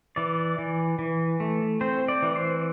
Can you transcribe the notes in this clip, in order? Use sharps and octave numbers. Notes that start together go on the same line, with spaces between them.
E3 D5
E3
E3
A3
C4 C5
D5
E3
C5